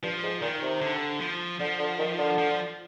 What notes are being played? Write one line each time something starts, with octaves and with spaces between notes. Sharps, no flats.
G2 F3
G#2
A#2 D#3
C3
D3
F3
D3 F3
D3
D#3
D3
F3